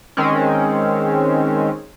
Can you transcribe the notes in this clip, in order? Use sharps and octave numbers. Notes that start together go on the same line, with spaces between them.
D#3 G#3 C4 C#4